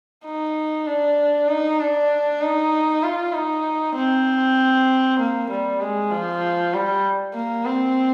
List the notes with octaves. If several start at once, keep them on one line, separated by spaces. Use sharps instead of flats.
D#4
D4
D#4
D4
D#4
F4
D#4
C4
A#3
G3
G#3
F3
G3
A#3
C4